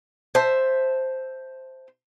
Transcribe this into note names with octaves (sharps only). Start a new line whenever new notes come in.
C5 E5 A5